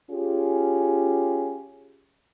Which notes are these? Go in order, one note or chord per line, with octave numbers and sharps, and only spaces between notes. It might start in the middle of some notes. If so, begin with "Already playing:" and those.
C#4 F4 G4 G#4